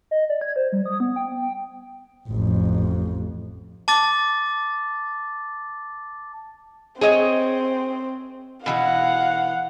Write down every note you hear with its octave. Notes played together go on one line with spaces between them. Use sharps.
D#5
D5
G#6
C5
G3
D#6
B3
G5
G5
A1 F2
A5 D6 A6
C4 G#4 C#5 D#5
B2 E3 F#4 F5 F#5